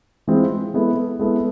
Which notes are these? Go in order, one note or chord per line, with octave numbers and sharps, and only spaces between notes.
E3 G#3 C4 F4
G#3 B3 E4 A4
G#3 B3 E4 A4